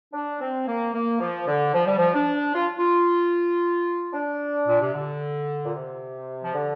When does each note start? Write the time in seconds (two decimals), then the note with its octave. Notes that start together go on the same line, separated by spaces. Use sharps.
0.13 D4
0.40 C4
0.67 A#3
0.93 A#3
1.20 F3
1.47 D3
1.73 F3
1.85 G3
1.97 F3
2.13 D4
2.53 F4
2.77 F4
4.13 D4
4.67 A#2
4.81 C3
4.94 D3
5.65 A#2
5.74 C3
6.42 F3
6.53 D3